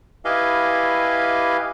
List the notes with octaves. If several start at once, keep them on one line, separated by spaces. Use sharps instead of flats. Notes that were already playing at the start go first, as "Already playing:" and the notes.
E4 G4 B4 D#5 F5 G#5